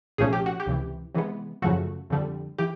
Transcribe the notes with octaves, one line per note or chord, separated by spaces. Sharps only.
C2 A#2 F3 A3 C#4 G#4
G4
F#4
G4
C#2 C3 E3
C3 E3 G#3 B3
F#2 C#3 F3 A3 F#4
F2 D3 G3
E3 G4